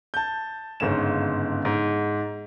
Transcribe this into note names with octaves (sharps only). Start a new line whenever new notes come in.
A5 G6
G1 G#2 C#3 C#4 E7
G#2